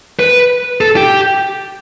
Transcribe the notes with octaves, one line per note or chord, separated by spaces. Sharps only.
B4
A4
G4